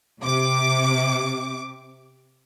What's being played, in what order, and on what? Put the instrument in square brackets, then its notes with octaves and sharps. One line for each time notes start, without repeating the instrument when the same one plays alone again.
[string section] C3 D6